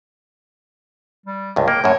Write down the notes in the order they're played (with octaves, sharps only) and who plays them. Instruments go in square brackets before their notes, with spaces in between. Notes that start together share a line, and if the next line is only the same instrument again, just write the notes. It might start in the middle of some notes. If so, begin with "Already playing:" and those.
[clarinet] G3
[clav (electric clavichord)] C#2 G2
[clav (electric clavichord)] A#3 [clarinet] G5
[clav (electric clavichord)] F#2 A2 [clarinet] C#5